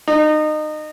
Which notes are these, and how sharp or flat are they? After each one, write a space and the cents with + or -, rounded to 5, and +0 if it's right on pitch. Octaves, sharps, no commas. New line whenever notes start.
D#4 -25